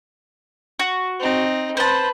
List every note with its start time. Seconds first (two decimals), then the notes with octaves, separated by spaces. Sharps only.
0.79 F#4
1.20 C4 D#4
1.77 B4 C5 A5